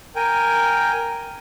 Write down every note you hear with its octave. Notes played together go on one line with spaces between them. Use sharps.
A#4 G5 G#5